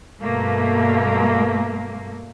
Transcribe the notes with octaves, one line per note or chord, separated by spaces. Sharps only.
G2 B2 A3 A#3